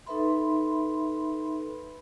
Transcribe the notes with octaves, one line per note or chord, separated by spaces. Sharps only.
D#4 A4 B4 E5 B5 C6